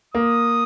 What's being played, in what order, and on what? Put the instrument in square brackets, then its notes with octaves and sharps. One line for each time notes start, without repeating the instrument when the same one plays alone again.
[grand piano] A#3 [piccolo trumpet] D#6